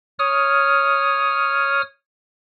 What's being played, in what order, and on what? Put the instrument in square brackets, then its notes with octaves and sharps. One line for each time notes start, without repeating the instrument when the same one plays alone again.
[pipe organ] C#5 D#6 F6